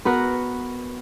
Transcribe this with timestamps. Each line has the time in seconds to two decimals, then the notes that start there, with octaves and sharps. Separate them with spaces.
0.05 B3 F#4 A#4 F#5